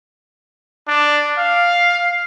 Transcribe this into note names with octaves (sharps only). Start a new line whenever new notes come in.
D4
F5